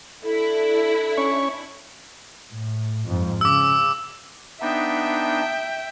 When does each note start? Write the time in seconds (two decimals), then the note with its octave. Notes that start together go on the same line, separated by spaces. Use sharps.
0.24 D4 E4 A4
1.17 C#4 C#5 C#6
2.51 A2
3.07 F2 G#2
3.41 C#3 D6 E6
4.61 B3 D4 D#4 E5 G5